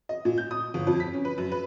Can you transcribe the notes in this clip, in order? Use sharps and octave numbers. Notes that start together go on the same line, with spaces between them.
D#5
A#2
G6
D#6
G1
F2
B6
C#4
B4
F#2
B4